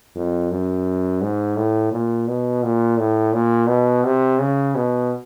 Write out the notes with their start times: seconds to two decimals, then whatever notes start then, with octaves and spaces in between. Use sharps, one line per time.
0.15 F2
0.51 F#2
1.22 G#2
1.57 A2
1.92 A#2
2.28 B2
2.63 A#2
2.98 A2
3.33 A#2
3.68 B2
4.04 C3
4.39 C#3
4.75 B2